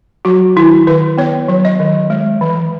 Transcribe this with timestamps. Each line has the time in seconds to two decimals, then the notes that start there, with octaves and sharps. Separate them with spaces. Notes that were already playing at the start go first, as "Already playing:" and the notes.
0.25 F#3 F#4
0.56 D#3 E4
0.87 D#3 B4
1.18 B3 C#5
1.48 F#3
1.65 D#5
1.80 D#3
2.10 G#3
2.41 E3